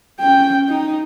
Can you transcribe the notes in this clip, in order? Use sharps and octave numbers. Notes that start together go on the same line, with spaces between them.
C#4 G5
D#4